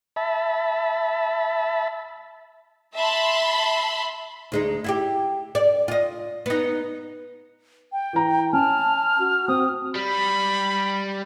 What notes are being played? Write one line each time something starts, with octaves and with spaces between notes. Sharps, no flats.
E5 A5 B5
E5 A5 B5 C6
D2 G#3 D#4
E4 F4 G4
D5
F4 D#5
B3 D#4
G5
E3 A#5
C#4 A5 F6
F#4
C4 D#6
G3 B5